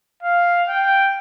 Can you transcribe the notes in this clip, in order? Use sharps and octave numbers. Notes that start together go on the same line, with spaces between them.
F5
G5